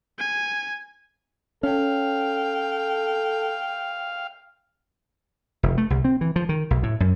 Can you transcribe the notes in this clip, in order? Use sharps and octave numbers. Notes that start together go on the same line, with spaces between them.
G#5
C#4 A4 F5 G5
F1
A3
C2
C4
E3
F3
D#3
B1
A2
F#2